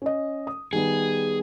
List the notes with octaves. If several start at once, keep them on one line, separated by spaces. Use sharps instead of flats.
C#4 D#5
D#6
D#3 G3 B3 G#4